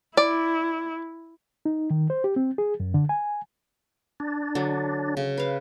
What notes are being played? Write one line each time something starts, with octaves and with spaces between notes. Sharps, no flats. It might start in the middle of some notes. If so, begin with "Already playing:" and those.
E4 D5
D#4
D#3
C5
G4
C4
G#4
F#2
D3
G#5
D4
D3 F#3
C#3
B4 F5